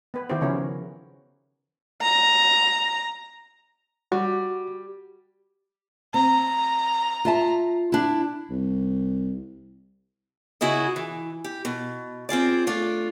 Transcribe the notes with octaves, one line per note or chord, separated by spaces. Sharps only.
B3 B4
D#3 B3 E4 F#4 G4 C5
C#3 F3 B3 C#4 E4 A#4
A#5
G3 F#4
C4 A#5
F4 E5 A5
D4 E4
C2
C#3 E4 F#4 G#4 D#5
E3
G4
B2
C4 F4 G#4 D5
A3 D4 F4